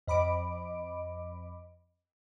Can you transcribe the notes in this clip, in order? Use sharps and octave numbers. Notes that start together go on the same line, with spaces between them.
F2 D#5 B5 D6 D7